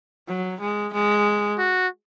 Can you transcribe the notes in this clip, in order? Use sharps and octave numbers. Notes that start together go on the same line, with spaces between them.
F#3
G#3
G#3
F#4